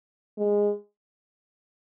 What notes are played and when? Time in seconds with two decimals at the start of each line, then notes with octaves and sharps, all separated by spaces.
0.38 G#3